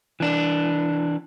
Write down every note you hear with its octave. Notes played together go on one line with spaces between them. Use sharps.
E3 D4